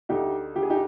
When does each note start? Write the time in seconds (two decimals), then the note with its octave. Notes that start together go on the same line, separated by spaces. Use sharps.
0.09 D2 D#4 G4
0.55 D3 G4
0.63 G#4
0.70 D#4 G4